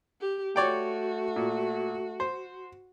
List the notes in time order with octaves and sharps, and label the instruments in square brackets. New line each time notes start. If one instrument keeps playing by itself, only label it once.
[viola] G4
[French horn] A3 [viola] F#4 [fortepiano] C#5 D5 G5
[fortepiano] A#2
C5